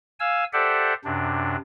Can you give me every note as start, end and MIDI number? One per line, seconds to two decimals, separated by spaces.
0.20 0.44 77
0.20 0.44 80
0.20 0.44 88
0.53 0.94 67
0.53 0.94 69
0.53 0.94 72
0.53 0.94 74
0.53 0.94 76
0.53 0.94 78
1.04 1.56 42
1.04 1.56 48
1.04 1.56 62